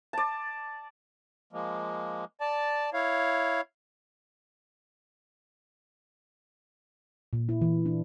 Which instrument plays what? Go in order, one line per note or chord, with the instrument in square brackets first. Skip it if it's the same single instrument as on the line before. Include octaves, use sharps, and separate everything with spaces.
[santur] D5 A5
[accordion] F3 G#3 A#3
D5 A5
E4 C#5 F5
[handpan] A#2
E4
E3
D4